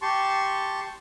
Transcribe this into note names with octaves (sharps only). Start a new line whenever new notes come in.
G4 A5 C6 C#6